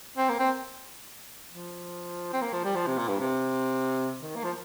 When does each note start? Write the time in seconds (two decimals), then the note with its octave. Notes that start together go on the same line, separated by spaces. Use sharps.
0.17 C4
0.29 A#3
0.40 C4
1.52 F3
2.33 C4
2.42 A#3
2.53 F3
2.64 G3
2.75 F3
2.87 C3
2.98 A#2
3.09 G2
3.20 C3
4.21 D#3
4.36 A#3
4.44 F3